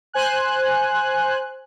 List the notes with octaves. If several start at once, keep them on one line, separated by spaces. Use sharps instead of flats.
C5 G#5 F#6